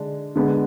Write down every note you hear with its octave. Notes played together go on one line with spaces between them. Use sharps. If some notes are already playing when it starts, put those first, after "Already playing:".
Already playing: D3 G#3 D4
D3 G#3 B3